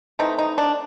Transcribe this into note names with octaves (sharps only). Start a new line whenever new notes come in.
E3 A3 C4 D#4
D#4
D4